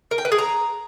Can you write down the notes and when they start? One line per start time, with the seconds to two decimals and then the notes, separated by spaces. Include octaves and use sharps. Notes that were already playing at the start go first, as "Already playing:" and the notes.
0.11 A#4
0.18 G5
0.25 B4
0.32 G#4
0.38 A#5